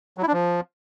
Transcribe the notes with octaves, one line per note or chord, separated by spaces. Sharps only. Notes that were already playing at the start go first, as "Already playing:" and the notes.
F#3
E4
D4
F3